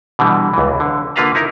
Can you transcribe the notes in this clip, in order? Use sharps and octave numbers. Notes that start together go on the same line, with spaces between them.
B2 D3 E3 G3
C#2 E3
D3
D3 A#3 F4 B4 F5 A#5
D#4 E4 A#4